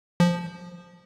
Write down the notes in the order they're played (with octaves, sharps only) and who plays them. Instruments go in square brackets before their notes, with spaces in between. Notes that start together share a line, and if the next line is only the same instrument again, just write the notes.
[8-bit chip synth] F3